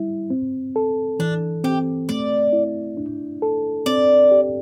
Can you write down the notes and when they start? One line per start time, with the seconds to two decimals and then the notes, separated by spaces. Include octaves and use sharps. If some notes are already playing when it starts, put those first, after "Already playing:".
Already playing: G3 E4
0.30 C4
0.76 A4
1.19 E3 D4
1.64 C4 G4
2.09 A3 D5
2.53 E4
2.97 D4
3.42 A4
3.86 C4 D5
4.31 G4